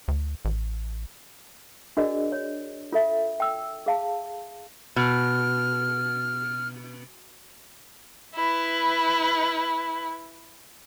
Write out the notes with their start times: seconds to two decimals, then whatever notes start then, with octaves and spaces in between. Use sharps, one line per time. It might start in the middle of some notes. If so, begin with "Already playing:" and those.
0.08 D2
0.45 A1
1.97 D4 F#4 G#4 A#4 D5 D#5
2.32 C#5
2.92 F4 A4 E5
3.40 G5 E6
3.86 G#4 F5 A5
4.96 B2 F6
8.35 E4 B4